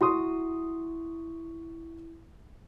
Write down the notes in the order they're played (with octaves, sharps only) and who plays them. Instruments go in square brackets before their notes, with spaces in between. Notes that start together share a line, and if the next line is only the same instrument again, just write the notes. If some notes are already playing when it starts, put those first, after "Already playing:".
[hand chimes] E4 [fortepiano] F#4 C6 D#6